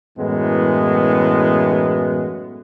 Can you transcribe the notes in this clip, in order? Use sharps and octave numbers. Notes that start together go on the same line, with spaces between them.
F#2 A2 E3 G#3 B3